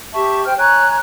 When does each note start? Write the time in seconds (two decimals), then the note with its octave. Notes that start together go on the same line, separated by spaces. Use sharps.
0.14 G4 E5 A5 C#6
0.46 C5 G5 F6
0.58 C#5 G#5 A#5 F#6